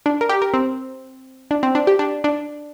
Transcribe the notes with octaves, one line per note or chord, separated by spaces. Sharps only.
D4
A#4
G4
A#4
C4
D4
C4
D4
G4
D4
D4